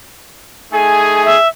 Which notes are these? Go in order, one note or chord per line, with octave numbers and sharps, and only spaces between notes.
A3 D#4 G#4 G#5
E5